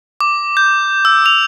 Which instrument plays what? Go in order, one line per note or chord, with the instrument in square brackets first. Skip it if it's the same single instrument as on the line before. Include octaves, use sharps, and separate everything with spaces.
[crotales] D6
G6
E6
F7